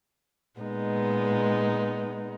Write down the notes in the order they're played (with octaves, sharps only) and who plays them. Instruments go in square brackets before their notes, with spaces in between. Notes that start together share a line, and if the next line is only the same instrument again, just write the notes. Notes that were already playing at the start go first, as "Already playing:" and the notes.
[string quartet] A#2 G#3 B3 D#4